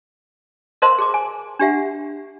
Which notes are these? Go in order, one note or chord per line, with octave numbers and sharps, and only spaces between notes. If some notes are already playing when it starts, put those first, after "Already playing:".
A#4 C5 D#5 F5 A5 C6
G#4 D6
G#5
D4 G4 E5 F#5